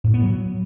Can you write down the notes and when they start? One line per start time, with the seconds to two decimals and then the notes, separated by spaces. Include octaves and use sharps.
0.04 A2
0.14 B3
0.24 F#3